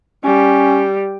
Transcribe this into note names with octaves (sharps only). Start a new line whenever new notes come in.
G3 C#4